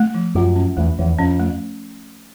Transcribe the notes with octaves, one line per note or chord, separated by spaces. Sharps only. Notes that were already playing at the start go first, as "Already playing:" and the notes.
Already playing: A3
F3
F#2 F4
C#4
E2 A3
E2 F3
F2 C#4
A3